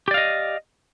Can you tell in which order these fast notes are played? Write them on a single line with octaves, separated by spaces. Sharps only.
G4 D5 F5 D#5